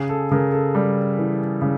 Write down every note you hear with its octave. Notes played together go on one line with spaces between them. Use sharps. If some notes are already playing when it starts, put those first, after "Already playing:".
Already playing: C#3 G#4
A4
C#3 A#4
A4
G3
E3
C#3